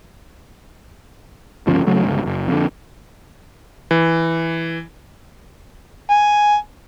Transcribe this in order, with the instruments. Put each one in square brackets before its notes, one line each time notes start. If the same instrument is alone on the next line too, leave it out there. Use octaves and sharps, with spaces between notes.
[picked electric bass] G1 C#2 F3 C#4
C#3 F#3 A3
G1 C#2
F#1
F2 D3
[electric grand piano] E3
[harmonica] G#5